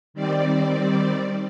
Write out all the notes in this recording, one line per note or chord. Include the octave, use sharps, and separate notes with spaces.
D#3 G3 C4 D5